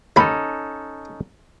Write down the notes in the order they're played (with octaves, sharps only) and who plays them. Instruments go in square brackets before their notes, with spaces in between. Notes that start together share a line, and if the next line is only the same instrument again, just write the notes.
[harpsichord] D#2 B5 [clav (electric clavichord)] C#4 D#4 A4